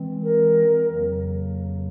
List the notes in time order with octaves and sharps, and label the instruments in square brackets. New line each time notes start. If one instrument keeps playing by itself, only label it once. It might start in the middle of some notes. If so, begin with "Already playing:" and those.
Already playing: [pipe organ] E3 G#3 C4
[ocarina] A#4
[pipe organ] F2 C#3 F#3 A#3